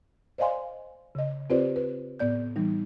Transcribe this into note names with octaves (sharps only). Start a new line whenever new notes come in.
C5 D5 D#5 F5 G#5 C6
C#3 D#5
C4 F4 G4 B4 C5 D5
B4
A2 B3 D5 G6
E3 G3 D#4